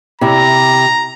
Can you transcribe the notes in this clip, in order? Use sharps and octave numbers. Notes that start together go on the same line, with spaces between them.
C3 E4 A#5